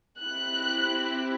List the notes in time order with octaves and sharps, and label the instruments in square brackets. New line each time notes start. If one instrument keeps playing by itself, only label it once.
[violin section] C4 E4 G4 F#6